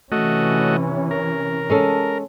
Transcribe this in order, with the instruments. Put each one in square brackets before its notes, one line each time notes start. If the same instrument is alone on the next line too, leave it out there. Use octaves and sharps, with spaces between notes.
[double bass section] C3 E3 C#4 [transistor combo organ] A3 F#4 D#5
[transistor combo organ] A#4
[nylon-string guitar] G#3 C#4 A4